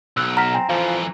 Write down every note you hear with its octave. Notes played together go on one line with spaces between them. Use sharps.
B1 E6 F#6
F#5 A#5 F6 B6
C4 G#5
F2 E3 F3